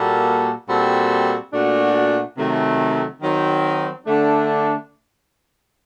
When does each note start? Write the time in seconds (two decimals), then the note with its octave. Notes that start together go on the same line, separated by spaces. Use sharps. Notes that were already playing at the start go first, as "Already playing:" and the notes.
Already playing: A#2 G3 A#3 F#4 A4
0.68 A#2 G3 C4 F#4 A4
1.53 A#2 A3 D4 F#4
2.37 C3 D#3 F#3 A3
3.22 D#3 F#3 C4
4.07 D3 A3 D4